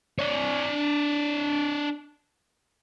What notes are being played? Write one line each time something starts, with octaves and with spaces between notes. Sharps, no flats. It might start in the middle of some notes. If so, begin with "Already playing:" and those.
D4 C#5